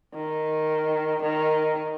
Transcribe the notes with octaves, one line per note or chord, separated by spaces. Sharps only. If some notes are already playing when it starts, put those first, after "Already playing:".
D#3
D#3